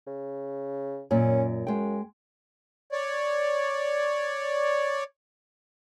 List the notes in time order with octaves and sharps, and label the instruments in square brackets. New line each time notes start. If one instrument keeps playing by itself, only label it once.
[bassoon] C#3
[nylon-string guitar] F#2 A#2 [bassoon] C#4
[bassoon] F#2 [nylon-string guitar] G#3 G5
[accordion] C#5 D5